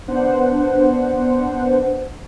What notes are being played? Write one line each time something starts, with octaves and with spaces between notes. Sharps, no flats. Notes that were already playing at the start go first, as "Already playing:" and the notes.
B3 D4 C5 F#5